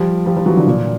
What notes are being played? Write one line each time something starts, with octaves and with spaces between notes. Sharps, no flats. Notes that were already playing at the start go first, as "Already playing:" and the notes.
Already playing: F3 G3
F3 G3
F3 G3
E3 F#3
D3 E3
A#2